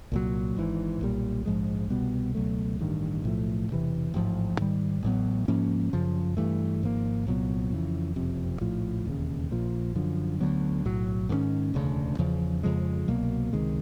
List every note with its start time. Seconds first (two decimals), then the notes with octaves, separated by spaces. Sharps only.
0.12 C2 A#2 F#3
0.56 G#1 G#2 E3
1.01 B1 A#2 G3
1.46 A#1 G#2 F3 G#3
1.90 C2 B2 G3 B3
2.35 C#2 B2 F#3 A3
2.79 A1 G2 D#3
3.24 B1 A2 F3 A3
3.69 E1 D2 C3 E3
4.14 A1 G#2 F3
4.58 G#2 D#3 G3
5.03 A1 A2 F#3 B3
5.48 G#2 F3 A#3 C#4
5.93 F#2 C#3 F3
6.37 G2 E3 A3
6.83 G#1 G#2 F3 A#3
7.26 C2 A#2 F#3 B3
7.72 F2 C#3 E3
8.16 F#1 F2 C3
8.61 A#1 A2 F3
9.05 E1 D#2 C#3
9.51 A#1 A#2 F3
9.95 F#2 D3 F3
10.40 D2 D3 F#3 B3
10.85 B1 A2 F#3
11.29 G#2 D#3 G#3 C#4
11.74 E1 D2 C#3
12.19 E2 C#3 F3
12.63 F2 C#3 F3 G#3
13.08 C2 B2 F#3 A#3
13.53 C#2 C3 D#3 G#3